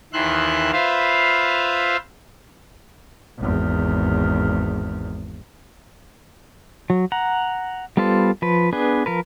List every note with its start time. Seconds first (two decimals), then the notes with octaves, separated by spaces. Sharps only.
0.13 D#2 D#3 E3 E5 C6 F#6
0.72 F4 B4 C5 E5 F5
3.38 G#1 E2
6.90 F#3
7.12 F#5 A#5
7.97 G3 B3 F4 A4 C5
8.42 F3 B4
8.73 B3 D4 G#4 B4
9.06 F3 A#4 B4